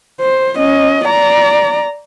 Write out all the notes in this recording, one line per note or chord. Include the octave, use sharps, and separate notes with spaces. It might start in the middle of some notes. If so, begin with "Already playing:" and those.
C5
C#4 D#5
D5 A#5